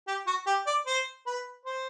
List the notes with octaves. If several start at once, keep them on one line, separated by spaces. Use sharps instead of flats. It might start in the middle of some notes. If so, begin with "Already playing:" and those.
G4
F#4
G4
D5
C5
B4
C5